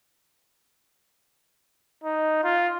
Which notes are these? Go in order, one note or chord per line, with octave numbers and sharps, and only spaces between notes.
D#4
F4